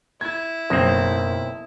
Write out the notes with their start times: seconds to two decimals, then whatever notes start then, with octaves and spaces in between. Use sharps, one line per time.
0.21 E4 G#6
0.70 F#1 B1 C4 D#6 A#6